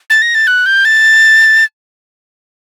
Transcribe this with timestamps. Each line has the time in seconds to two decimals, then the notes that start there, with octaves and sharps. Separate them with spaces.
0.10 A6
0.22 A#6
0.35 A6
0.47 F#6
0.66 G6
0.85 A6